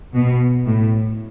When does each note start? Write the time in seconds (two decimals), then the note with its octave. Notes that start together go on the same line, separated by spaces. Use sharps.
0.14 B2
0.66 A2